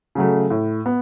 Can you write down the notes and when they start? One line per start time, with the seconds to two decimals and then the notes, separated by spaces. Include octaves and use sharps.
0.15 C#3 F#3 A3
0.50 A2
0.86 B3